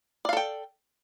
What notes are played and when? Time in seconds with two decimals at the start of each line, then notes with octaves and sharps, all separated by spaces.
0.25 D5
0.29 F5
0.33 A4
0.37 G5